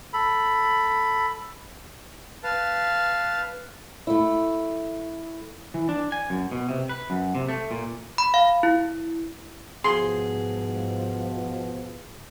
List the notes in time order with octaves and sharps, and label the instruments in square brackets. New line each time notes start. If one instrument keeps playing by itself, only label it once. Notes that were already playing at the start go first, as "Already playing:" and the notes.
[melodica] A4 B5
[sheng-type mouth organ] B4 F5 A5
[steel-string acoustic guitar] A3 E4
[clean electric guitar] E3
D4
G#5
F#2
B2
C3
B4
F#2
C3
A3
A#2
[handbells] B5
F5
E4
[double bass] G#2 [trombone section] B2 F3 [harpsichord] G#4 [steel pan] C6